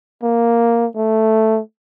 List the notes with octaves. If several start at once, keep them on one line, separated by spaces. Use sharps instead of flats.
A#3
A3